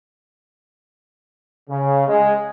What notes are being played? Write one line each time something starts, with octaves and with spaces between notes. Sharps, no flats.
C#3
G#3